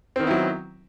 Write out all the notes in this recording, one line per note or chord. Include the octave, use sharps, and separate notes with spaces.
D#3 F#3 B3 C4 E4